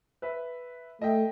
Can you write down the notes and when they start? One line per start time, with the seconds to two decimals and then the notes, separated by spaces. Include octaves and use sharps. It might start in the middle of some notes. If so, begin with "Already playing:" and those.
0.22 B4 E5
1.01 A3 D#5 E5 G5